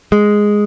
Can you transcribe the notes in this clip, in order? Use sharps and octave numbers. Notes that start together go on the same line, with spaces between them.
G#3